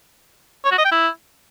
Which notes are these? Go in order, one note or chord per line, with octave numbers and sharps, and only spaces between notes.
C#5
F#4
D#5
G5
E4